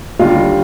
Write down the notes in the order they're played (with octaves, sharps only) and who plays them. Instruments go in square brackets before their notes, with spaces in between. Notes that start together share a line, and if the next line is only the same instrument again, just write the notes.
[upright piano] D#2 D3 G3 F4